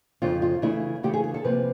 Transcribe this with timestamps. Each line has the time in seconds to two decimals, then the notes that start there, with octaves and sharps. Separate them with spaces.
0.22 F2 C#3 F3 F4
0.42 F4
0.62 C#3 E3 A3 E4
1.03 C#3 E3 A3 G4
1.13 G#4
1.24 G#4
1.34 A4
1.44 C3 F3 A#3 B4